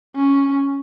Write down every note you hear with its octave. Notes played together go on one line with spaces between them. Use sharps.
C#4